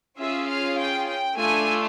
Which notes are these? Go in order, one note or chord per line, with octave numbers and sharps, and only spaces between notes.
C#4 F4 G#4 E5
F5
G5
G5
A3 D4 F4 G#5